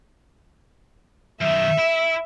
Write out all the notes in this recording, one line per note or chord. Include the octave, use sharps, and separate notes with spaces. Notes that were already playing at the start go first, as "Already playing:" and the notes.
F#2 D#3 E5
E4